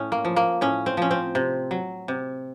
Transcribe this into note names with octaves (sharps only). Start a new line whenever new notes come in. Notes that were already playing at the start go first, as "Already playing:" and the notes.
Already playing: A2 C#4
A#3
F3
A#3
A2 C#4
C4
F3 C#4
C4
C3
F#3
C3